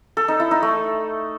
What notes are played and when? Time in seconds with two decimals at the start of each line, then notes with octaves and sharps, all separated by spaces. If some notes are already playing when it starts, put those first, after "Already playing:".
0.17 A4
0.28 D#4
0.40 E4
0.51 D#4
0.62 A3